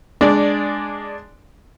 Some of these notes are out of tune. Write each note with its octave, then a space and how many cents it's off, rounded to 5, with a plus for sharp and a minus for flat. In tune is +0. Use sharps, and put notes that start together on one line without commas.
G#3 +0 D4 +5 D5 -10